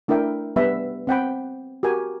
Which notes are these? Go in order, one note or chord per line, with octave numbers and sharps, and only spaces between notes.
A3 D4 E4 A#4 E5 G5
G3 B3 B4 E5
C4 F#5 G5 B5
F#4 G4 A#4 G#5